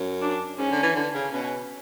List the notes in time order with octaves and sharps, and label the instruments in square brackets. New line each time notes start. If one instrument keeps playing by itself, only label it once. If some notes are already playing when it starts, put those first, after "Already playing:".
Already playing: [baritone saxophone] F#2
[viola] D4
[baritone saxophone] G#2 [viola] C#4
[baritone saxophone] D3
E3
D3
C#3
[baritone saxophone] B2 [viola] C#4